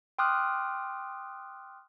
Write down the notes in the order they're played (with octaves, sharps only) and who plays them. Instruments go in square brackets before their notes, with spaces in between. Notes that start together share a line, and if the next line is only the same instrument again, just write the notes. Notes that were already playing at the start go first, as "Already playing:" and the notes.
[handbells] G5 C6 D6 D#6 F6 F#6